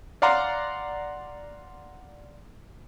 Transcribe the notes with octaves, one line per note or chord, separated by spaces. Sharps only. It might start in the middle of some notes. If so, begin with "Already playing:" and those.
D5 F5 F#5 A#5 C6